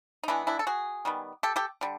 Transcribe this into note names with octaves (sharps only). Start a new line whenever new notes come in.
D#4
E3 G#3 B3 D4 E4
D4 E4
A4
F#4 G#4
D#3 G3 B3
G4 A4
G4 A4
D3 G3